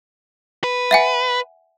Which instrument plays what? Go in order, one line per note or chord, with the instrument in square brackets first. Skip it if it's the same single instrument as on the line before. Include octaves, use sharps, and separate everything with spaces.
[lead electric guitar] B4
[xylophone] E5 F#5 G#5